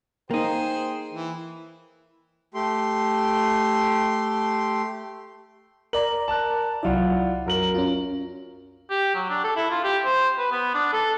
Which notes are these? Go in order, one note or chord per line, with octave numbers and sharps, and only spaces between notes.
A#3 D#4 G#4 C5 G5
E3
A3 G4 C6
A#4 D5 A#5 F#7
A5 F#6
C2 F#3 E4 F4 D5 F#5
F#2 A#4 F#7
C#4 F4
G4
F#3
D4
A4
E4
F4
G4
C5
B4
B3
D4
A4